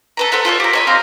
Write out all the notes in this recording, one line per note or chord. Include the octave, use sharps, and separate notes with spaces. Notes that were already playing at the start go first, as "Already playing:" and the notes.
A4 B4 A#5
A4 C5 E5 F#5
F4 A4 C5 C#5
G4 A#4
C#5 D#5 B5
C4 F5 A#5 C6